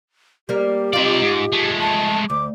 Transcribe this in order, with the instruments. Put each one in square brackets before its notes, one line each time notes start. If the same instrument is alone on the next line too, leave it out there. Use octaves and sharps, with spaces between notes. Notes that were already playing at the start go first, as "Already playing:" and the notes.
[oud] G3 A#3 [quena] G4
[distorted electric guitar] C3 D5 [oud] D#4 F4
[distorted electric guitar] G#2
G#3 A3
[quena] A5
[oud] D2 [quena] D6